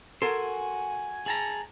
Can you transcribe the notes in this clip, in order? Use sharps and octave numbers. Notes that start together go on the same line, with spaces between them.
F#4 A4 A#4 G#5 C6
G#4 A5 A#5